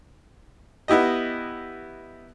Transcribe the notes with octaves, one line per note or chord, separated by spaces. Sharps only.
B3 E4 G4 D#5